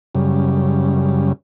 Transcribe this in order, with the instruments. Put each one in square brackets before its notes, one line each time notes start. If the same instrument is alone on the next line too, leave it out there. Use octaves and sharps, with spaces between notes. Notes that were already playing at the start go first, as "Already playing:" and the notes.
[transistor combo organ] F#2 C#3 G3